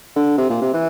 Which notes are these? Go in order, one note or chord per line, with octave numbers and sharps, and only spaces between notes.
D3
C3
A#2
C3
E3